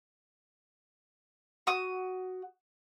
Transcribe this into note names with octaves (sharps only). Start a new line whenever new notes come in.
F#4 D#6